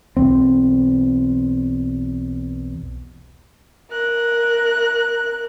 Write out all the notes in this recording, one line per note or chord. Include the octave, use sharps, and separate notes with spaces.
B1 E2 C4
A#4 F#6